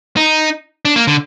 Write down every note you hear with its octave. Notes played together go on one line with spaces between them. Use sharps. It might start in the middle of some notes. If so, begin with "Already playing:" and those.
D#4
D4
A#3
D3